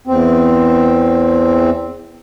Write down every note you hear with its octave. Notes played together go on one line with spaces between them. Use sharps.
E2 C4